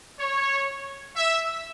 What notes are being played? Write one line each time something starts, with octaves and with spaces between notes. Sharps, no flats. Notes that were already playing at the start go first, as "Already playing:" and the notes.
C#5
E5